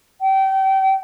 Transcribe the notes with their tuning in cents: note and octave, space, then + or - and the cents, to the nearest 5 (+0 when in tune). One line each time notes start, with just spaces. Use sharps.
G5 -30